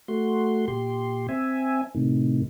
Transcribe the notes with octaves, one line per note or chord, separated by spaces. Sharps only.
A3 F#4 C6
A#2 G4 C6
C4 E5 G#5
A2 C3 D#3